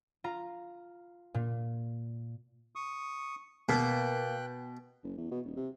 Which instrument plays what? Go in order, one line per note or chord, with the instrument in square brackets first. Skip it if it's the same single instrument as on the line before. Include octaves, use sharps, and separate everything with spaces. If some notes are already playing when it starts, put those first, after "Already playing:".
[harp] F4 A#5
A#2
[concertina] C#6 D#6
[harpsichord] B2 [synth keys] A#3 [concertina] G5 F#6
[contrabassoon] F#1
E2
B2
D#1
C3